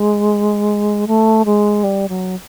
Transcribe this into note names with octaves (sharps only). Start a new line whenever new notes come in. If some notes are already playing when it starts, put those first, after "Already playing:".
Already playing: G#3
A3
G#3
G3
F#3